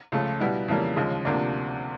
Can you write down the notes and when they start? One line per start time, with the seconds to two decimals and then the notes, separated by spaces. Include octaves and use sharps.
0.12 C#2 C#3 F3 A3
0.40 B2 G3 B3 E4
0.68 F2 C#3 E3 G3 A#3
0.96 D#2 C#3 F3 G#3
1.25 D2 C3 F3 A#3 D4